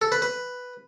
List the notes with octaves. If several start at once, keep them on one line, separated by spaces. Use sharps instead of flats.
A4
B4
B4